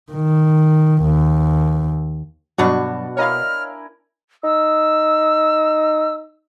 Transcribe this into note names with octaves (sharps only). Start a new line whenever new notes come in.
D#3
D#2
G2 B2 F#3 D4 F#4
E4 A#4 C#5 D#5 F5 G#5 F6
D#4 E6